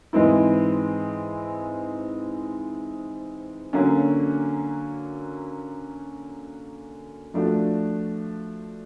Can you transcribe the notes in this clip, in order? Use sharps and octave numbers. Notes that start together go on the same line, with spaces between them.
G#2 E3 G#3 C4 E4
D3 F#3 A#3 C#4 F#4
F3 A3 D4 F#4